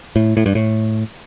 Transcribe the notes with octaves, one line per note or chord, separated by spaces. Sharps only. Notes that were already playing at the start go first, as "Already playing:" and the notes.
A2
A2
G2
A2